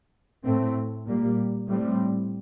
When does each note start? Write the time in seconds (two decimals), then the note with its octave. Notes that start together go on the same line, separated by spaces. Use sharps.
0.43 A2 A3 C4
1.06 A#2 G3 A#3
1.68 A2 G3 C4